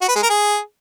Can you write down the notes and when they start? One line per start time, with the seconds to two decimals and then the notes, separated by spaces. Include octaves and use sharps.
0.01 F#4
0.09 B4
0.16 G#3
0.23 A#4
0.30 G#4